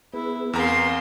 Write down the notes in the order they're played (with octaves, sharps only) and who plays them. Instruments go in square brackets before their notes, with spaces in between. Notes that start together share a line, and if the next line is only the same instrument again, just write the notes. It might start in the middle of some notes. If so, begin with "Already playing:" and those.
[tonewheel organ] B3 G#4 B4 [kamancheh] E4
[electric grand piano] E2 A#5 [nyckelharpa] C4 C6 [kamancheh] A#4 F5